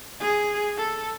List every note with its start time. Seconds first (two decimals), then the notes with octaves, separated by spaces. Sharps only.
0.20 G#4
0.77 A4